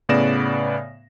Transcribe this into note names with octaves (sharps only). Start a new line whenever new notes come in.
A2 C#3 B3 D5 A#6 E7